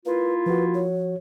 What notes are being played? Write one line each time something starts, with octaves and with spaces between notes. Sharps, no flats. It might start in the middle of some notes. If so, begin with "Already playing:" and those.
A#3 E4 F4 B4
F3 F#4 B4
C#5